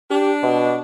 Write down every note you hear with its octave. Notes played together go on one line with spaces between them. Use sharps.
D4 G4
B2